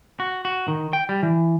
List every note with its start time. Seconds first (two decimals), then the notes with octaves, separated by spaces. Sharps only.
0.20 F#4
0.45 F#4
0.68 D#3
0.93 G5
1.09 G3
1.23 E3